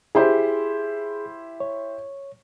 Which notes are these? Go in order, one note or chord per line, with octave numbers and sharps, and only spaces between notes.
E4 G4 G#4 C5
C#5